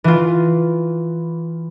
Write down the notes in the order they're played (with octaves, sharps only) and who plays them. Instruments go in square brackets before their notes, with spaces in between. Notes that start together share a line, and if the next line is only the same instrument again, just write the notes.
[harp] E3 F4